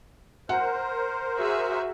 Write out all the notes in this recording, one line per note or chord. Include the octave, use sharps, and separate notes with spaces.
A#4 C5 F#5
F#4 G#4 E5